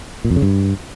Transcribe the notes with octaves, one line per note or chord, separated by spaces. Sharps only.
A#2
F2
C#3
G2